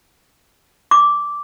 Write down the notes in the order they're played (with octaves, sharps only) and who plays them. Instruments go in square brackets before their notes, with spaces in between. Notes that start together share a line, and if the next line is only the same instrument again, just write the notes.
[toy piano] D6